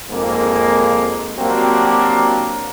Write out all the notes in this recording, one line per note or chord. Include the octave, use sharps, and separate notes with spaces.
G#1 F2 G#2 A#3
F#3 A#3 C4 D4 F#4 G4